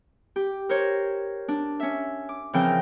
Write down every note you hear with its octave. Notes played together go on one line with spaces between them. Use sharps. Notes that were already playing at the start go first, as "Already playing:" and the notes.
G4
A#4 C5 C#5
D4
C#4 E5
D6
C#3 E3 F3 C4 A#4 G5